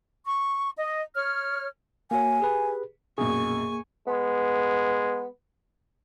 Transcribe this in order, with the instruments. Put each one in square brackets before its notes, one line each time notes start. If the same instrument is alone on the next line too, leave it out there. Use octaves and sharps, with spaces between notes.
[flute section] C#6
D#5
C#5 F6
[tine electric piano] A#3 F#4 C#5 [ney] G#5
[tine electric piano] G4 G#4 B4
[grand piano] A#1 F#2 B2 [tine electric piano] A#3 G#4 [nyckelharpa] G#5 C#6
[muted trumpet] G#3 [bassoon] B3